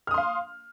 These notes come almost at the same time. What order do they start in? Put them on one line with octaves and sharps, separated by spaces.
F6 D#6 C6 F5